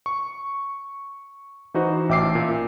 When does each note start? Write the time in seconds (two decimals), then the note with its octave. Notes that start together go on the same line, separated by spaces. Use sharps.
0.06 C#6
1.74 E3 D#4 F#4 C5
2.09 A1 E5 G5 D6 E6 C7
2.35 A#2